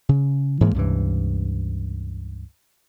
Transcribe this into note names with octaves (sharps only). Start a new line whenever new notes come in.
C#3
G#2 E3 G#3 A#3
C#2 G2 C3 E3